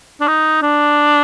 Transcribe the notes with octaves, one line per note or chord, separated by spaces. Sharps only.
D4
D#4
D4